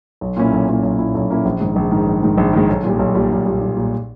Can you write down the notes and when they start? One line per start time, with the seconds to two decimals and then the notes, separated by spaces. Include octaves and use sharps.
0.21 B1
0.37 A#2 A#3 C#4 E4
0.52 B1
0.68 A#2 A#3 C#4 E4
0.83 B1
0.98 A#2 A#3 C#4 E4
1.15 B1
1.29 A#2 A#3 C#4 E4
1.45 A#1
1.61 G#2 D#3
1.76 A#1
1.91 G#2 D#3
2.07 A#1
2.22 G#2 D#3
2.38 A#1
2.53 G#2 D#3
2.69 B1
2.84 A#2 G3
2.99 B1
3.15 A#2 G3
3.31 B1
3.46 A#2 G3
3.61 B1
3.77 A#2 G3